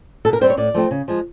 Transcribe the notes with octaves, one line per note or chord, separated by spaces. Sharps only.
B2 A4
A#4
G3 C4 C5
C#5
A2 D5
F3 A3 C4
C#3
F3 G#3